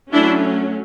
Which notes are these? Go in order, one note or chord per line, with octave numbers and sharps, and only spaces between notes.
F#3 A3 C#4 D4 E4